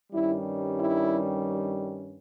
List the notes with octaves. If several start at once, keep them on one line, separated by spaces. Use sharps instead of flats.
G2 D#3 G3 C#4 E4
E4